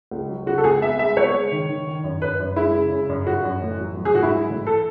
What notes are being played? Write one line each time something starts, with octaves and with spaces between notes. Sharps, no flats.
C#2
F#3
C#3 F#4
A4
C#2 G#4
B3 E5
G#3 E5
B3 C#5
G#3
D#3
D#3
D#3
F#2
F#2 B4
F#2
G#3 E4
C#3
C#3
F#2
F#2 F#4
F#2
A1
F#3
F#3
G#4
G#2 F#4
E4
F#3
A1
A4